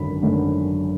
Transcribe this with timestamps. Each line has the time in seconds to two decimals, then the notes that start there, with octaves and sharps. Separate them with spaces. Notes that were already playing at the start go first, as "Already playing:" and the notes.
Already playing: G#1 F#2 D3 F#3 B5
0.22 G#1 F#2 D3 F#3